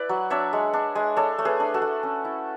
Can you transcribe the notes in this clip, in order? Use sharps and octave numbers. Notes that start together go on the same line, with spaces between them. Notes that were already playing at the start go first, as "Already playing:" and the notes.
Already playing: E4 B4 D5
F#3
D4 C#5 E5
G#3
D4
G#3
D4 A4 C#5
A3
G#4 B4
D4
F#4 A4
A3
C#4
E4